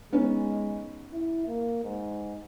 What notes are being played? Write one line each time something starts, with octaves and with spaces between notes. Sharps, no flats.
G#3 B3 C#4 D#4
E4
A#3
G#2